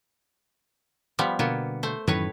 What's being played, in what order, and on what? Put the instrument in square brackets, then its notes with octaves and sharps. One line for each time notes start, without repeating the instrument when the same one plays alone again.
[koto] F3 G3 B3
[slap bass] B2 D3 [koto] A#3 B3
[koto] A3 C5
[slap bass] F#2 D#3 E3 [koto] A2 B4 C#5